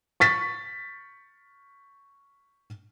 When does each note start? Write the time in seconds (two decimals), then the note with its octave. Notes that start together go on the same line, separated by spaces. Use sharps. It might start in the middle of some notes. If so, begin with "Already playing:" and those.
0.20 C#6 A6 B6